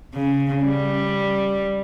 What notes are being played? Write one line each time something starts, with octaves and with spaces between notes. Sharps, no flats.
C#3
G3